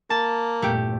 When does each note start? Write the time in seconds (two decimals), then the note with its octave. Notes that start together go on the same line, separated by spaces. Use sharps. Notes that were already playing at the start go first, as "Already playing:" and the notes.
0.10 A#3 A5
0.62 E2 G2 A#2 A3 G4